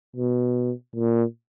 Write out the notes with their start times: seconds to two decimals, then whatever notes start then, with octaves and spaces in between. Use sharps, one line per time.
0.16 B2
0.96 A#2